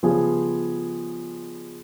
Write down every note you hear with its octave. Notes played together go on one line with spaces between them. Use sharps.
C#3 F3 G3 B3 F4 G#4